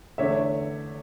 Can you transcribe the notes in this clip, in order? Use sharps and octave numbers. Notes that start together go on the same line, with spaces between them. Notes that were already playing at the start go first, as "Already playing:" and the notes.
E2 D3 A3 C#5 E5